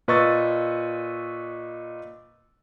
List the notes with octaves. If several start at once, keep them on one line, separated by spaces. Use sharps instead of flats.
A#2 B4 D#5 C#6 E6 A6